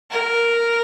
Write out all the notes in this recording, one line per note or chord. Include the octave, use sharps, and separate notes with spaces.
A#4